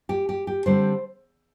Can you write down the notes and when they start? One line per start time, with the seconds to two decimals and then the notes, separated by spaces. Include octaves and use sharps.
0.09 G4
0.29 G4
0.47 G4
0.66 D3 G3 C4 C5